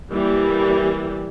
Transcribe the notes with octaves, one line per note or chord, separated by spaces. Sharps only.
E3 G3 A#3 G4